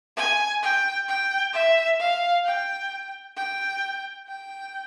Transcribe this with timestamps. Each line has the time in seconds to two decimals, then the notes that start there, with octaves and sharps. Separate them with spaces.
0.17 G#5
0.63 G5
1.08 G5
1.53 E5
1.99 F5
2.45 G5
3.36 G5
4.27 G5